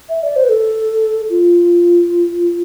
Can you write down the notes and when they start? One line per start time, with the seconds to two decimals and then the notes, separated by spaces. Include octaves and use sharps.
0.09 E5
0.23 D5
0.36 C5
0.44 B4
0.49 A4
1.30 F4